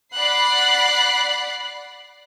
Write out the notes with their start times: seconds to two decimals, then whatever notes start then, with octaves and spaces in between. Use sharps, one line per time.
0.15 D5 F#5 B5 F#6 C7